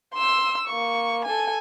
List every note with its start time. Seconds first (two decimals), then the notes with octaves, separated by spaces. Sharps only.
0.15 C6 E6
0.67 A#3 C#6
1.25 A4 G#5